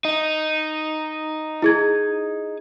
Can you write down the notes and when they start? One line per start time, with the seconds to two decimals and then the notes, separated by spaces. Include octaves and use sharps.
0.05 D#4
1.62 E4 G#4 G#6